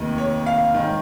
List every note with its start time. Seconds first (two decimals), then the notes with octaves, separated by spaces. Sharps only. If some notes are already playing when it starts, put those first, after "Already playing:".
Already playing: F1 D#2 D#3
0.18 C#5
0.46 F5
0.74 G#2 D#3